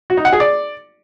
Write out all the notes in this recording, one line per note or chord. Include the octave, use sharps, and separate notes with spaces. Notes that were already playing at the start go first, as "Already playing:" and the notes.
F#4
D#4
F#5
G#4
D5